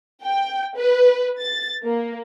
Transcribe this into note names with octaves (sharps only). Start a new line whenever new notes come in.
G5
B4
A6
A#3